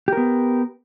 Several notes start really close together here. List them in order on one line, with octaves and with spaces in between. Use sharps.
G4 A#4 B3